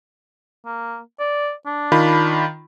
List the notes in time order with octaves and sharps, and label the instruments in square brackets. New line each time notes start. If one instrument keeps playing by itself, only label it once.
[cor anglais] A#3
D5
D4
[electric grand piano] D#3 F4 B5